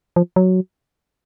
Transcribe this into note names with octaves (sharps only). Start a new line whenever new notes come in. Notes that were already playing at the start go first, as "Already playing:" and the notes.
F3
F#3